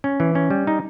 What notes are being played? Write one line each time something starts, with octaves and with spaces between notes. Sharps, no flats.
C#4
E3
C#4
G3
D#4